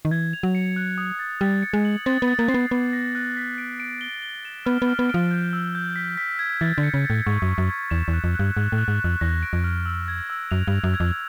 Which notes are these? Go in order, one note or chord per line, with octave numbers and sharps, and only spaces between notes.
D#3
E3 G#6
F7
F#3
C#7
F#6
D#6
A6
G3 A6
C#7
G#3
F#7
C4 A6
B3
A6
A#3
C4 C7
B3
B3 D6
A#6
F#6
B6
D7
D7
G7
G7
E7
B3 F6
B3
F6
B3
F3 D7
G6
E6
G6
B6
B6
G#6
E3 A6
D3
C#7
C#3
A6
A2
G#2 C#6
F#2
C#6
F#2
G#6
E2 E7
E2
F#6
F2
F#6
G2
G#2 F#6
A2
F#6
G#2
F2 F#6
E2 A#6
D7
F2
F6
E6
G#6
E6
F#2 F7
G2
F7
F#2
G#6
F2